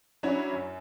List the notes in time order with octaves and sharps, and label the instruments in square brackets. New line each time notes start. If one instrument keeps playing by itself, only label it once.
[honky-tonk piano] F#3 C#4 D4 E4 F#4 C#5
F#2